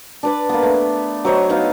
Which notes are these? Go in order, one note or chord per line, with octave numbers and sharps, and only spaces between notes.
D4 B4 D5
A#3 B3
A3
F#3 C5 C#5 D#5
B3 D#4 F5 D6